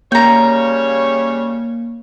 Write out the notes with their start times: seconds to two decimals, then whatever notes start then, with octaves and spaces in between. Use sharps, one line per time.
0.12 C#3 G3 A#3 C#5 G5 A#5